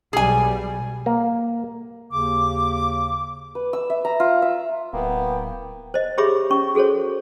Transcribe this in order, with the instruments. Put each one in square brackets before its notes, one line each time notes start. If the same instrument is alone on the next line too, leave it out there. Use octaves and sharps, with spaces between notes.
[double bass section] B1 G3 [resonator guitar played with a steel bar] G#4 G#5
[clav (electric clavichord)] A#3
[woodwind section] D#2 C#3 D6
[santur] B4
E6
E5
A#5
F4
E5
[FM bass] D1 [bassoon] A#3 [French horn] B3 [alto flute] G5
[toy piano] C5 D#5
G4 G#4 C#5 E5 B5 D6
C#4 C#6
F#4 G#4 A4 C5 C#5